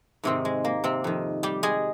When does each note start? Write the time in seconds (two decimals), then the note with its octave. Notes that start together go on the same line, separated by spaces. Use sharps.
0.23 G#2 C3 D#3 C4
0.45 G#3
0.65 A#3
0.84 C3 C4
1.04 F2 D#3
1.43 G3 G4
1.63 G#3 G#4